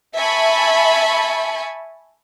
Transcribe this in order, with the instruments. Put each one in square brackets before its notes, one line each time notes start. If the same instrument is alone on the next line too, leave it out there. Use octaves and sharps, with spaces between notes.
[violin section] E5 G#5 A5 B5 C#6